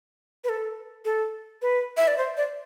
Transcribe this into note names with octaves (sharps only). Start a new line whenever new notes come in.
B4
A4
A4
B4
E5
D5
C5
D5